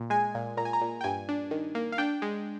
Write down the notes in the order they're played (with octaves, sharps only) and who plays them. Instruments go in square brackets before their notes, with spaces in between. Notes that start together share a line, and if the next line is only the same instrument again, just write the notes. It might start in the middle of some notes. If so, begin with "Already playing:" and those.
Already playing: [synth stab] A#2
G#3 G#5
A#2
A#2 A#5
G#5
A#5
A#2
G5
G2 G#5
D4
D#3
A#3
F5
D4 G5
G#3